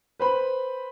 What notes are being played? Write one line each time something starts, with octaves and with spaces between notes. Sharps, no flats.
B4 C5 B5